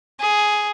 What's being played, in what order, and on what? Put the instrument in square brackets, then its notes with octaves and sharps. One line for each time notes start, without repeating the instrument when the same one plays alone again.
[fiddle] G#4